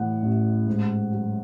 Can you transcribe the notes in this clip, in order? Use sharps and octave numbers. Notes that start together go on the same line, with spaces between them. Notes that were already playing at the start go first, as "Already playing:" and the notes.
Already playing: A2 E3 F#5
A1
G#2
F#3